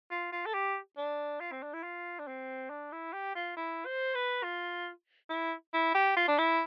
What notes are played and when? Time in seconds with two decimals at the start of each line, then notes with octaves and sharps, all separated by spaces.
0.11 F4
0.32 F4
0.46 A4
0.54 G4
0.97 D4
1.40 F4
1.51 C4
1.63 D4
1.73 E4
1.83 F4
2.19 D4
2.27 C4
2.70 D4
2.92 E4
3.13 G4
3.35 F4
3.56 E4
3.85 C5
4.15 B4
4.43 F4
5.29 E4
5.73 E4
5.94 G4
6.16 F4
6.28 D4
6.38 E4